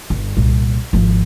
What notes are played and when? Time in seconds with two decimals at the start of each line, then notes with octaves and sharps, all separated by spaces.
0.10 G1
0.37 C2 A#2
0.93 G#1 F3